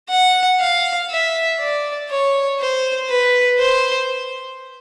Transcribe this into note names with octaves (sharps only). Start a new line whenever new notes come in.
F#5
F5
E5
D5
C#5
C5
B4
C5